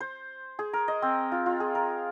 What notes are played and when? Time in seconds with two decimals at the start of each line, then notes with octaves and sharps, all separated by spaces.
0.01 C5
0.59 G#4
0.73 A#4
0.88 D#5
1.02 C4
1.32 F4
1.46 F4
1.60 G#4
1.75 A#4